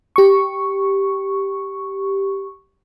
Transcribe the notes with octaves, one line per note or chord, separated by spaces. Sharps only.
G4 C#6